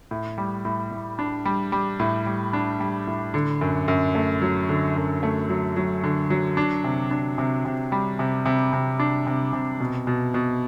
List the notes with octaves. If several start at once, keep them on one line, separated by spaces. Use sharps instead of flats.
A2
G3
A2
A2
D4
G3
G3
A2
G3
D4
G3
A2
D3
F#2
F#2
A3
F#3
D3
F#2
A3
F#3
F#3
D3
F#3
D4
C3
D4
C3
C3
G3
C3
C3
C3
D4
C3
C3
B2
B2
B2